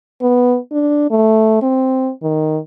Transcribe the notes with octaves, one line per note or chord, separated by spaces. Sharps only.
B3
D4
A3
C4
D#3